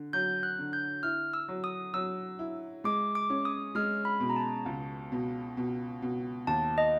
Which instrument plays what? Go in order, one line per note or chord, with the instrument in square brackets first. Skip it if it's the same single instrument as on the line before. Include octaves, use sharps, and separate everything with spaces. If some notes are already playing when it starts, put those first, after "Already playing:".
Already playing: [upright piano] D3
[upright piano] F#3 [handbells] G6
[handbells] F#6
[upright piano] D3
[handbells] G6
[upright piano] E4 [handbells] F6
[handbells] E6
[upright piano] F#3
[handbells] D#6
[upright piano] F#3 [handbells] E6
[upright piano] E4
[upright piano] G#3 [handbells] D6
[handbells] D6
[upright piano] C#4
[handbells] D#6
[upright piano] G#3 [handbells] F6
[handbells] B5
[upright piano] B2
[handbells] A#5
A5
[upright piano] C#2
B2
B2
B2
[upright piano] D#2 [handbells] A5
[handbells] D#5